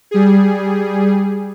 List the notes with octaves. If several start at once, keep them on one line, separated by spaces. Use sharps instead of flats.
G3 G#4